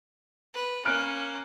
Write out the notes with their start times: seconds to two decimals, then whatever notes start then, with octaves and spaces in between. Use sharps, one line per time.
0.54 B4
0.85 A#3 C#4 F6 F#6 D7